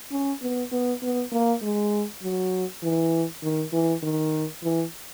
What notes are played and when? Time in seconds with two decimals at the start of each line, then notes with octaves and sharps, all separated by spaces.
0.11 C#4
0.42 B3
0.72 B3
1.02 B3
1.32 A#3
1.62 G#3
2.22 F#3
2.82 E3
3.43 D#3
3.72 E3
4.03 D#3
4.63 E3